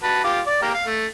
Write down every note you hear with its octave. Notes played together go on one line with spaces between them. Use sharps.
F#4 B4 A5
F4 G4 D6
D5
A#3 G4 A#4
F5
A3